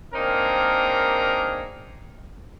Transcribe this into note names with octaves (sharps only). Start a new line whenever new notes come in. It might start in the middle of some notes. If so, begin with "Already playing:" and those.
A#3 C4 D4 D#4 G#4 A#4